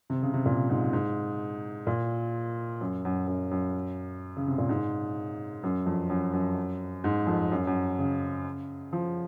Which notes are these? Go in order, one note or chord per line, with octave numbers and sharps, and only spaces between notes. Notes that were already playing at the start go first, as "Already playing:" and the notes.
C3
C#3
C3
A#2
G#2
G#2
A#2
F#2
F#2
F#2
F#2
C#3
C3
A#2
G#2
F#2
F2
F#2
F#2
G#2
F2
F#2
F#2
C#3
F3